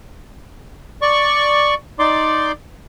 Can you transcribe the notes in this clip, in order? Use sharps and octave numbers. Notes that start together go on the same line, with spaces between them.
D5 C#6
D#4 D5 C6 D6